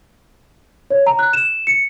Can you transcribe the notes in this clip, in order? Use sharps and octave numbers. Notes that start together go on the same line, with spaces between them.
C#5
A#5
F#6
E7
C#7